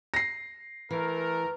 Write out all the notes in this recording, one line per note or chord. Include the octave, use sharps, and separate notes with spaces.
A#6 C7
E3 A3 A#4